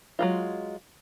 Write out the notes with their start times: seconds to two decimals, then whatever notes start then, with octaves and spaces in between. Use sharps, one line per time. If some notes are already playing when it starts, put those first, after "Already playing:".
0.19 F#3 G#3 F4